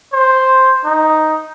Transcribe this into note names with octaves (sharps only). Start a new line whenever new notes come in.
C5
D#4